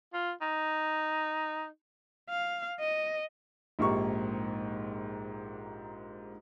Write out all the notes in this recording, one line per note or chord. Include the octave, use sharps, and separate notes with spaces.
F4
D#4
F5
D#5
A#1 G#2 A#3 G4 C#6